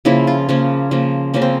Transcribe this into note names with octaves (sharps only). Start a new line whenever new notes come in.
C#3 F3 A#3 E4
F4
C#3 F3 A#3 C#4
C#3 F3 A#3
C#3 F3 A#3 C#4
C4